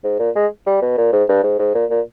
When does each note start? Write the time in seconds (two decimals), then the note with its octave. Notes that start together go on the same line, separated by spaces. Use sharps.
0.04 G#2
0.19 A#2
0.36 G#3
0.67 G3
0.82 B2
0.98 A#2
1.13 G#2
1.29 G2
1.43 G#2
1.59 G#2
1.74 A#2
1.90 A#2